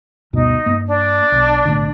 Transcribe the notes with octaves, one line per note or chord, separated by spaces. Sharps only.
D2 G2 B2 D#4
G2 A#3
D4
B1
B1 A2 D3